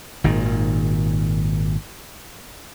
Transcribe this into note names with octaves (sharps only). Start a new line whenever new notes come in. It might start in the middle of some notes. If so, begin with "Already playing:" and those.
G#1 A#2 D#3